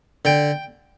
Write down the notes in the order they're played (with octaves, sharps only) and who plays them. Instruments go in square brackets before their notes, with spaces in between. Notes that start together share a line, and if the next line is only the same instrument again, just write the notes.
[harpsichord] D3 G5